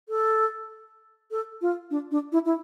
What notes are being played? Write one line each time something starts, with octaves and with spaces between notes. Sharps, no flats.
A4
A4
F4
D4
D4
E4
E4